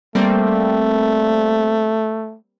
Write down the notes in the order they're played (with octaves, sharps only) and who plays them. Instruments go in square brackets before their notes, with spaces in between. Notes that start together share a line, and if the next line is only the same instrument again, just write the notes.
[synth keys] G3 A#3 C4 [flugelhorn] A3